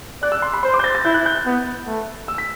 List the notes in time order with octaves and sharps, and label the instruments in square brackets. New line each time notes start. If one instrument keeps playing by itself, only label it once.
[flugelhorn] D5 [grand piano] F#6
[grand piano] E6
C6
B5
[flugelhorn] C5 [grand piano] C6
[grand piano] D6
G6
A6
A6
[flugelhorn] E4 [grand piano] G6
[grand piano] F#6
G6
F#6
[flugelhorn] B3
A3
[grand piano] E6
B6